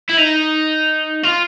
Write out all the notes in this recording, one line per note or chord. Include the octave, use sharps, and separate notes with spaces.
E4
D#4
F4